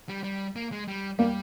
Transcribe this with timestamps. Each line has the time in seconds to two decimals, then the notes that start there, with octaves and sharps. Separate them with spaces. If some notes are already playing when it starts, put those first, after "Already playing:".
0.09 G3
0.24 G3
0.56 A#3
0.72 G#3
0.88 G3
1.19 G3 A#3